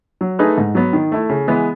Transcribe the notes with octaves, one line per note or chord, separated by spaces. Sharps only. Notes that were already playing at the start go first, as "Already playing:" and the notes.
F#3
A3 D#4 G#4 B4
G#2
F#3 B3
D#3
A3 E4
C#3
E3 G#3 B3